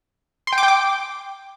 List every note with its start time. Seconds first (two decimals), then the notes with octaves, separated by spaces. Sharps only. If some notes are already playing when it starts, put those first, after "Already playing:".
0.47 C6
0.53 G5
0.58 D6
0.63 G5
0.68 D6